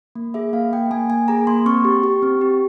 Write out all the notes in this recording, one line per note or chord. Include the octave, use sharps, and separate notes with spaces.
A#3
G#4 E5
A#3 F5
A#3 G5
A#3 G#5
A#3 G#5
G#4 A#5
A#3 C6
C4 C#6
G4
G4
C4
G4